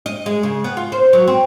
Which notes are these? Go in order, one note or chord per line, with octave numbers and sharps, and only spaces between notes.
D#5
G#3
C#3
B3
F4
C5
F#3
C4